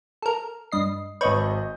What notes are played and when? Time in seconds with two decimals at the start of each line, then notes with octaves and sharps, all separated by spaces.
0.22 A4 A#4
0.72 G2 D#5 C7
1.21 G#1 B4 C#5 D#5 C#6 G6